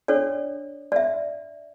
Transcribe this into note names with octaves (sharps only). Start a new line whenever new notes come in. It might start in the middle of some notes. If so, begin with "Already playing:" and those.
D4 A4 C#5 D5
D5
E5